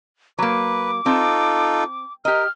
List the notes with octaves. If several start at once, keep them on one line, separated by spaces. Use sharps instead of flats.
F#3 A#3 B4 D6
C4 D#4 F4 A4
G4 A#4 D#5 F6